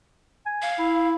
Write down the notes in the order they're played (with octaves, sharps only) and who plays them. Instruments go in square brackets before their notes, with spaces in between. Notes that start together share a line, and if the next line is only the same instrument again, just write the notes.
[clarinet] G#5
[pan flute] F5
[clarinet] E4